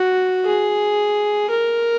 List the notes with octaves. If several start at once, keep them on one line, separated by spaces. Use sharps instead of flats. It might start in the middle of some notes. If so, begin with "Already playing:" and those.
Already playing: F#4
G#4
A#4